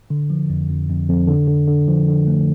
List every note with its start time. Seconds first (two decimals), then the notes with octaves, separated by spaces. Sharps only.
0.10 D3
0.30 F3
0.50 F2
0.69 F2
0.89 F2
1.09 F2
1.28 D3
1.47 D3
1.68 D3
1.88 F3
2.08 D3
2.27 A3